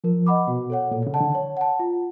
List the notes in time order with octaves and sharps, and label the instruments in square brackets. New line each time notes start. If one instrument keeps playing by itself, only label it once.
[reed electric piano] F3 [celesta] A#4
[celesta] D#5 F#5 B5 D6
[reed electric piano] B2 [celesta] F#4
[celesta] A4 C#5 F#5
[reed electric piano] A#2 [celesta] A4
[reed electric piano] C#3
[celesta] D5 F#5 A5
[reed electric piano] D3
[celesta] C#5
F#5 A5
F4